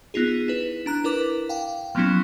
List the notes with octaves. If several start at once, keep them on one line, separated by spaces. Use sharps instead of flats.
B3 D#4 F4 G#4
E4 B4
D4 A#5 F#6
E4 A#4 B4 D6
F5 G5
F3 F#3 A#3 B3 C#4 E4